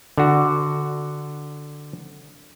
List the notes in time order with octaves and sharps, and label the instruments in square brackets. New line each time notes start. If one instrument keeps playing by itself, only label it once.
[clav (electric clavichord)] D3 F#4